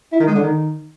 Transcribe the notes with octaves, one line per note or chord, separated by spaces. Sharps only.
E4
D#3
G#3
D3
D#3